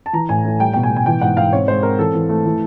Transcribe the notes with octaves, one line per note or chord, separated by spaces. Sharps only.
A5
E3 A#5
A2 G#5
A2
G3 G5
B2 G5
G#5
B2
G#5
E3 G5
G#2 F#5
G#2 F5
C4 C#5
G#3 C5
C4 A#4
E3 A4
E3
A3
E3